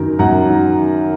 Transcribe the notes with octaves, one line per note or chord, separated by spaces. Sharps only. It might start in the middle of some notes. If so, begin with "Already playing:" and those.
Already playing: F#2 D#3 A#4
F#2 F#5 A#5
D#3